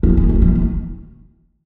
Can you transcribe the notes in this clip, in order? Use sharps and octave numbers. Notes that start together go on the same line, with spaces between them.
F3
G#3
G#3
F3
D#3